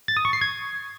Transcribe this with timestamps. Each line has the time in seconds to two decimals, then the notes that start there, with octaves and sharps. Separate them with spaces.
0.08 A6
0.17 D#6
0.25 C#6
0.33 C7
0.41 G#6